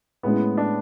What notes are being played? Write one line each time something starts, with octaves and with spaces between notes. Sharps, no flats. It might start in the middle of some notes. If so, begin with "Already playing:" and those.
A2 G#3 B3 C#4 E4
D4